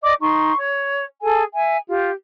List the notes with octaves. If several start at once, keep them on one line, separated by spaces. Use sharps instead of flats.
D5 D#5 D6
D#4 C6 C#6
C#5
G#4 A4 G#5
E5 G#5
F4 G4